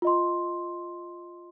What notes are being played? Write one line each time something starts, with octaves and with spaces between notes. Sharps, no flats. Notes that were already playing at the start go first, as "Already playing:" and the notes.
F4 D#5 C6